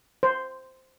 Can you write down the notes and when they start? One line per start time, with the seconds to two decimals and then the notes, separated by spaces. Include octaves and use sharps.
0.23 C5